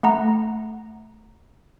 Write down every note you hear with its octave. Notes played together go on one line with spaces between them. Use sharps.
A3 F#5 A#5